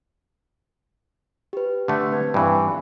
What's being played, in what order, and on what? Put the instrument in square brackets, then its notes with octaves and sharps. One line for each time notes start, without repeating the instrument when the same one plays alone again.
[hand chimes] G4 B4
[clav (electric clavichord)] D3 A3
[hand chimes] C4 B4 G#6
[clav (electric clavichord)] G2 E3